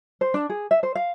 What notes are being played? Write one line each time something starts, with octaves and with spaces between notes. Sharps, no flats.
C5
D4
G#4
E5
C5
F5